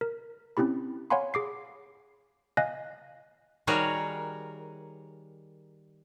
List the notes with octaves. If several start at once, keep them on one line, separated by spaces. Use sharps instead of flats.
A#4
C4 C#4 E4 G4 B5
C#5 F5 F#5 G#5 B5 C6
G#4 D6 C7
D#5 F5 G#5 F#6 A#6
D#3 G3 F#4 G#4 A#4 C#5